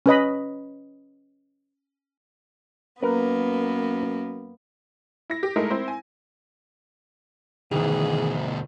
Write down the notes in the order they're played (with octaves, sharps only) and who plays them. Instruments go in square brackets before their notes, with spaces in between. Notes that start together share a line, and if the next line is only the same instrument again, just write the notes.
[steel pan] C#4 B4 D#5 B5
[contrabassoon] F#2 [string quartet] A#3 B3 [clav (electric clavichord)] A#4 B4
[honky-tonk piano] E4 A#6
G4
G#3 A3 D#4 E4 A#4
C4 E4 C5
G#5
[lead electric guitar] D2 B2 [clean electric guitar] D#3 E3 [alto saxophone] G#4